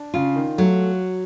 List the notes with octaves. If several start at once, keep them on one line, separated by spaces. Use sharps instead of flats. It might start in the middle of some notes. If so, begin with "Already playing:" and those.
Already playing: D4
C#3 F4
D#3
F#3 A3